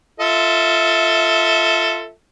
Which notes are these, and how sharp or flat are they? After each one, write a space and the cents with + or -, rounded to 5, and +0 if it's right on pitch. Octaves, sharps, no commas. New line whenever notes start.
F4 -15 A4 +10 E5 -25